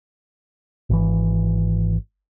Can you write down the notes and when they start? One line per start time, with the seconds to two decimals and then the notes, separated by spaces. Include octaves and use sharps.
0.90 G#1 E3